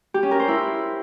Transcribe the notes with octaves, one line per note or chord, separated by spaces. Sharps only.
G4
C#4
A#4
C5
E4